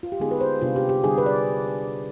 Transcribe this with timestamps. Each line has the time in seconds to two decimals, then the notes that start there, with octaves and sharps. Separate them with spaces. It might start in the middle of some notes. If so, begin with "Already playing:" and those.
0.03 F4
0.12 G4
0.20 D3 G#3 B3 D#4 G#4
0.31 B4
0.41 C5
0.61 C3 G3 B3 D4 F4
0.76 G4
0.89 G4
1.04 D3 G3 D4 G#4
1.18 B4
1.26 D5